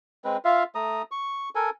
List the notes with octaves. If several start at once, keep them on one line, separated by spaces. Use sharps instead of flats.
G#3 C4 B4
F4 E5 F5
A3 A#5 D#6
C#6
A4 A#4 G#5